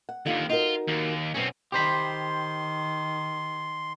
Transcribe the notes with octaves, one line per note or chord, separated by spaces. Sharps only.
F#5
D#2 D3 D#3 F4
D#4 F4 F#4 A#4
D#2
F#2 B2 C4 C#4
D#3 G4 C5 B5 C6